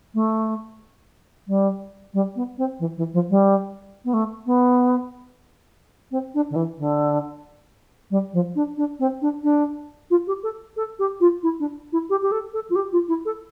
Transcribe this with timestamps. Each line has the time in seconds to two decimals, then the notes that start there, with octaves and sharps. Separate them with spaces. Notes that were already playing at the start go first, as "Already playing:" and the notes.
0.14 A3
1.48 G3
2.14 G3
2.36 B3
2.58 C4
2.80 E3
2.97 E3
3.14 F3
3.30 G3
4.05 B3
4.14 A3
4.46 B3
6.11 C4
6.34 D4
6.50 D3
6.56 E3
6.78 D3
8.11 G3
8.33 F3
8.56 D4
8.77 D4
9.00 C4
9.22 D4
9.44 D4
10.11 F4
10.27 G4
10.43 A4
10.77 A4
10.99 G4
11.21 F4
11.43 E4
11.60 D4
11.93 E4
12.10 G4
12.22 G4
12.32 A4
12.53 A4
12.70 F4
12.76 G4
12.93 F4
13.08 E4
13.26 A4